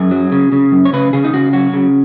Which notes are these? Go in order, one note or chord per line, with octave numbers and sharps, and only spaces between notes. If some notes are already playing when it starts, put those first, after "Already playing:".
Already playing: F#2 G#4
F#3
C#3
C#3
F#2
C#5
C#3 B4
C#3 G#4
D#4
C#3 F#4
F#3 F#4
C#3